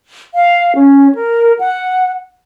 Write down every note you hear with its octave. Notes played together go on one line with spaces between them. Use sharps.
F5
C#4
A#4
F#5